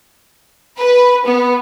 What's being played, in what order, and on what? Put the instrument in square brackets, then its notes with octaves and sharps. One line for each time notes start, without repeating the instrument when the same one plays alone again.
[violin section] B4
B3